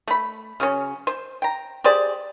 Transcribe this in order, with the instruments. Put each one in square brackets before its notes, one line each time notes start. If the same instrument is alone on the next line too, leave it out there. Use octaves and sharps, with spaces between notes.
[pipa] A3 B5
C#3 F#3 C#4
C5
G5 A#5
G4 G#4 C5 D5